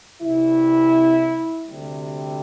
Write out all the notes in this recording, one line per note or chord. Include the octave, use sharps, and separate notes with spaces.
C2 C3 E3 G3 E4
D2 C3 G3